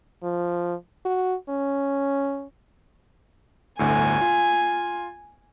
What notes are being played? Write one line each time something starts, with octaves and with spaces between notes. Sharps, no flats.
F3
F#4
C#4
G1 D2 A2 G#5
F4